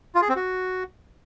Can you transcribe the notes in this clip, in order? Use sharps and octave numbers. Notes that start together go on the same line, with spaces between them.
F4
G#4
C4
F#4